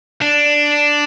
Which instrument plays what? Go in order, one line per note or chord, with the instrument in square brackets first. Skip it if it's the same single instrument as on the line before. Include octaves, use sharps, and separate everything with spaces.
[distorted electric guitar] D4